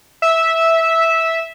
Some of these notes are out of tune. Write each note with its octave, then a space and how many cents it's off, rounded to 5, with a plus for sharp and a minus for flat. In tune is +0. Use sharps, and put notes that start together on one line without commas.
E5 -10